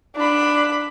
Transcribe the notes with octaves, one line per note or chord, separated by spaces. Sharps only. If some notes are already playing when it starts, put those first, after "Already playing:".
D4 B5